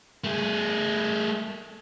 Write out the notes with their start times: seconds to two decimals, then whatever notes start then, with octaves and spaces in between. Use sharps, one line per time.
0.24 A3 G#4